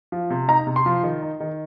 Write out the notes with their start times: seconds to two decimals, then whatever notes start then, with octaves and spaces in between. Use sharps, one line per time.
0.12 F3
0.30 C3
0.48 D#4 A#5
0.67 C3
0.76 C6
0.86 F3
1.04 D#3
1.22 D#4
1.40 D#3